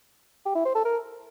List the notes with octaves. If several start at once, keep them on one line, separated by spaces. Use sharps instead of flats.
G4
E4
C5
A4
A#4